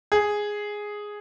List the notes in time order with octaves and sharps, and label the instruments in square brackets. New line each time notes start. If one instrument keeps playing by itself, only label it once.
[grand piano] G#4